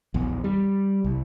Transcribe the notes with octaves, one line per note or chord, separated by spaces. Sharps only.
A#1 E2
G3
C2